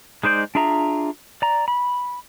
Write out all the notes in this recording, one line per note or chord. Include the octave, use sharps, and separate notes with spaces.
G#3 D#4 C5 D5 G6
D4 F4 G#4 E5 A#5
D5 A#5
B5